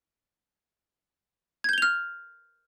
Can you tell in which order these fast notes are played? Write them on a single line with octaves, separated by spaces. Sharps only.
G#6 G6 G7 F7 F6